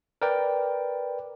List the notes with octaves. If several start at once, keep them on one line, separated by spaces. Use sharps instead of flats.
A#4 B4 D5 G5